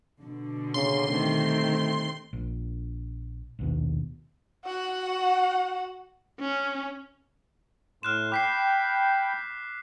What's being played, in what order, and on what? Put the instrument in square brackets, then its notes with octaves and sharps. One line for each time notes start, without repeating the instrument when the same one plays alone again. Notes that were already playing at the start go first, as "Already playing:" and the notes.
[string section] B2 D3
[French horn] C#3 [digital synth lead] C6
[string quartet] D#3 G3 C4 [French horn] A3
[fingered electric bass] A#1
A#1 D#2 B2
[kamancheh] F#4 F#5
[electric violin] C#4
[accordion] A2 C6 [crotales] F6 F#6 E7
[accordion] G5 B5 [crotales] D6 B6 C7